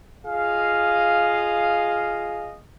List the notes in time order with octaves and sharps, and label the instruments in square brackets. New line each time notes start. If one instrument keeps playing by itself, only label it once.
[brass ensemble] F4 G#4 D#5 F5